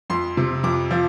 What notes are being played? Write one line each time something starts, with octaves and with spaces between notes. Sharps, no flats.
F2 C6
C3
F2 D6
F3